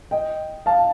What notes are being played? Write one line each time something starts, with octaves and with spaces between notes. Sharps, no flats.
D#5 G5
F5 A5